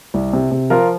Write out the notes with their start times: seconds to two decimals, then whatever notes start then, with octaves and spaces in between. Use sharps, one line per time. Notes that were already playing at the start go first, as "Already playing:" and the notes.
0.14 C2
0.33 C3
0.52 C3
0.70 F3 F4 A#4